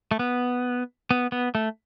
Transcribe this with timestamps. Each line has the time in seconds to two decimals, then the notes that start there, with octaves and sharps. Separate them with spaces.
0.11 A3
0.19 B3
1.11 B3
1.32 B3
1.55 A3